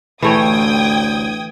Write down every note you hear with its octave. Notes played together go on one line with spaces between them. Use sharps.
A1 D2 E3 A3 C#5 G5 D#6 G#6